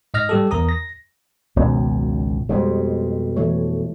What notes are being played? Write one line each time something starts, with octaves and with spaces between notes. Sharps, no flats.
G#2 D#5 F6 A#6
G3 G4 A4
E2 A#4 A#5 D#6
A#6
G#1 C#2 F#2 B2
F2 B2 G3 G#3 C5
E3 A3 C#5